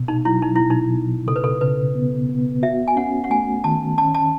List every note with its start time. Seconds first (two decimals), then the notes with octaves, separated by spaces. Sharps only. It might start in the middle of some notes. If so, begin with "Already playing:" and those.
Already playing: B2
0.08 D#4
0.25 F#3 E4
0.42 D#4
0.56 B2 E4
0.70 D#4
0.93 B2
1.27 C#3 A4
1.36 B4
1.44 A4
1.61 C#3 B4
1.95 B3
2.29 B3
2.63 F#4 E5
2.88 G#5
2.96 C#4 F#5
3.24 F#5
3.30 A3 G#5
3.64 D#3 A5
3.98 C#4 A5
4.14 A5